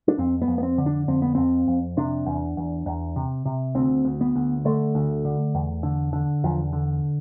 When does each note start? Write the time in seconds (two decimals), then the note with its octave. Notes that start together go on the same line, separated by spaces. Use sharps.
0.08 D4
0.18 F2 C4
0.42 B3
0.48 F2
0.58 B3
0.63 C4
0.78 D3
0.86 D4
1.08 F2 C4
1.22 B3
1.35 F2 C4
1.68 F2
1.97 C3 D4
2.26 E2
2.57 E2
2.86 E2
3.16 C3
3.45 C3
3.75 D2 C4
4.05 D2
4.21 B3
4.36 D2
4.65 D3 A3
4.95 D2
5.25 D3
5.55 E2
5.83 D3
6.13 D3
6.44 E2 F3
6.73 D3